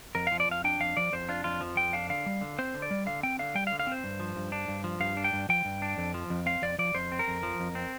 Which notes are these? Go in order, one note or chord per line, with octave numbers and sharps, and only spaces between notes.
F2 A#4
F3 F5
D5
F2 F5
D4 G5
F2 F5
F3 D5
F2 C5
D4 F4
F2 F4
F3
F2 G5
D4 F5
D3 F5
G3
D3
C4 C5
D3
D5
G3
D3 F5
C4 G5
D3 F5
G3 G5
F5
D3
F5
C4 C5
G2
F3
G2
D4
G2
F3
G2 F5
D4
G5
G2
F3 G5
G2
D4
F2
F3
F2
C4 F5
F2 D5
F3 D5
F2 C5
C4
A#4
F2
F3
F2
C4